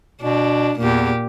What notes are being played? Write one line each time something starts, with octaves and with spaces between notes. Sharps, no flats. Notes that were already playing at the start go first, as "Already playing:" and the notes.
B2 D4
E2 A#2 G4